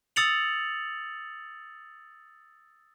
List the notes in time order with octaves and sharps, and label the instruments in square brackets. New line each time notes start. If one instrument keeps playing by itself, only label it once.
[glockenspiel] D#6 E6 A6 C#7 F7 F#7